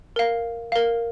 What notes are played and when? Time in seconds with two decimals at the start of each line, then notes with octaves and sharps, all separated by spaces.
0.16 A#4 F5
0.72 A#4 F5